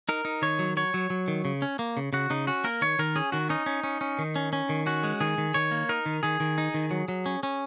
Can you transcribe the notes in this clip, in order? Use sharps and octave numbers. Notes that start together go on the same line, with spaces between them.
D#4 A#4
D#4
D#3 C#5
F#3
F#3 C#5
F#3
F#3
D#3
C#3
C#4
A#3
C#3
C#3 F#4
C#3 D#4
C#4 F#4
A#3 A#4
D#3 C#5
D#3 A#4
C#4 G#4
D#3 F#4
C#4 D#4
C#4
C#4
C#4
D#3
C#4
C#4
D#3
C#4 F#4
G#3
D#3 G#4
D#3
D#3 C#5
A#3
D#4 A#4
D#3
D#3 G#4
D#3
D#4
D#3
F#3
F#3
C#4
C#4